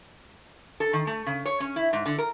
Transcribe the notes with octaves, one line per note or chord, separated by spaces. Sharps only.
A4
D#3
A3
C#3
C#5
C#4
E4
G#2
D3
A#4